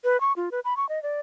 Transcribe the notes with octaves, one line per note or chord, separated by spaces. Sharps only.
B4
C#6
F4
B4
B5
C#6
D#5
D5